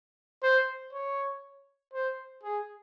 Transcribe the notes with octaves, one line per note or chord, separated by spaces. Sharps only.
C5
C#5
C5
G#4